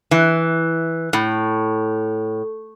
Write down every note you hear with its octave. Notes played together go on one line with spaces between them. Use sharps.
E3
A2